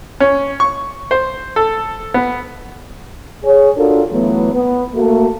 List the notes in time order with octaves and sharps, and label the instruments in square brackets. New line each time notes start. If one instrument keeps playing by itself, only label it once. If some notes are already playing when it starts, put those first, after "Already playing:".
[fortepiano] C#4
C#6
C5
A4
B3
[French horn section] G#4 C#5
D4 F4 F#4 A4 A#4
E3 F#3 A3 B3
B3
A3 A#3 F#4